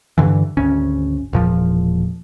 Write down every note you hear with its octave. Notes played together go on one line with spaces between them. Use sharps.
G2 D3 E3
G#1 D2 C#4
E1 A#2 F3